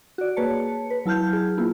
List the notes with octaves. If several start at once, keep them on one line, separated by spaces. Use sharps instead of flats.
F#4 D5
A#3 G#4 B4 C#5 A5 C#7
B4
F#3 E4 A5 F6 G6
G#4
A#3 B3 E4 F4